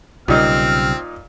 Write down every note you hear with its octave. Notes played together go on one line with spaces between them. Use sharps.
B1 A#2 C#3 G3 C4 D#4 F6